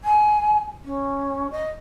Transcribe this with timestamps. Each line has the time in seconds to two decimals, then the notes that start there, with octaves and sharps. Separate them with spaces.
0.04 G#5
0.84 C#4
1.51 D#5